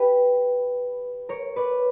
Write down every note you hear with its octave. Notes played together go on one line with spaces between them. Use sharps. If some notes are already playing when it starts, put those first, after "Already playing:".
Already playing: G4 B4
A#4 C#5
B4 D5